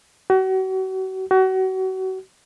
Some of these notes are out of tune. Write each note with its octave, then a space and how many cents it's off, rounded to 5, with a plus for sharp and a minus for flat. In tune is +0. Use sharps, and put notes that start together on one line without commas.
F#4 +40
F#4 +35